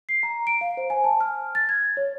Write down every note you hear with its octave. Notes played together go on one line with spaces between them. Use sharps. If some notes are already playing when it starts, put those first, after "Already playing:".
C7
A#5
D7
F5
C5
G#5
A5
F6
A6
G#6
C#5